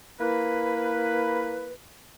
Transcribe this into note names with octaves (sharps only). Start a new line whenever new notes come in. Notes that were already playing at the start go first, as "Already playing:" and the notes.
A#3 E4 B4